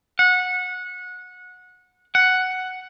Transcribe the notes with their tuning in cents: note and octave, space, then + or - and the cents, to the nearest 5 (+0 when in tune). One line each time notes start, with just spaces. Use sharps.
F#5 -20
F#5 +5